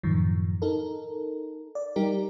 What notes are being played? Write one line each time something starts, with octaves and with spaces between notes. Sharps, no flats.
F#2 A2 D#3 F3
D#4 A4 A#4
D5
G3 D#4 G4 A#4